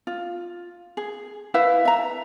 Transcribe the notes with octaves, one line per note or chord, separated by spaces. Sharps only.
F4
G#4
E4 B4 E5 F5
E5 A#5